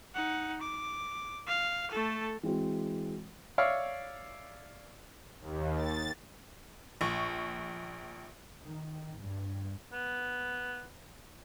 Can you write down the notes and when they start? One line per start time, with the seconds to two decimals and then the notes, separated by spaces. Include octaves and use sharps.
0.14 D#4 F#5
0.61 D6
1.47 F5
1.91 A3 A4
2.43 E3 G#3 C4 F#4
3.58 C#5 D5 E5 F5 C#6
5.41 D#2
5.76 A6
7.01 A#1 C#6
8.62 D#3
9.18 G2
9.92 B3